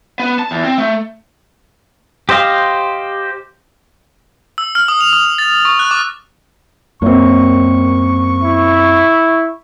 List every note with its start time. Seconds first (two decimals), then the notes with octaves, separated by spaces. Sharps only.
0.19 B3
0.39 A5
0.51 E2
0.64 C4
0.78 A3
2.29 G4 C5 D#5 F5
4.58 E6
4.75 F6
4.88 D#6
5.01 F7
5.13 D#6
5.38 A6
5.65 C#6
5.79 F#6
5.91 D6
7.02 F#2 A#3 C4 C#6
8.43 E4